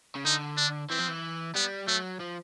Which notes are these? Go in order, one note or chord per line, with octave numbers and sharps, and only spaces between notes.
C#3
D3 D#4
D4
E3 C4
F3
E3
G3 B3
F#3 A3
F3